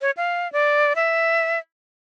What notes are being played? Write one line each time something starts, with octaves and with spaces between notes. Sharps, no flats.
C#5
F5
D5
E5